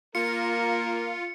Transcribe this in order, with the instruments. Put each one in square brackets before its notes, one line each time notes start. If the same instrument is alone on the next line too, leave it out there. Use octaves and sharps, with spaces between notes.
[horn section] A#3 A#4 [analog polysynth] F4 [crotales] C#7